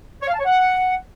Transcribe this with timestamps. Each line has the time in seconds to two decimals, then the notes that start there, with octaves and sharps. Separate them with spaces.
0.22 C#5
0.28 F5
0.33 A5
0.39 C#5
0.45 F#5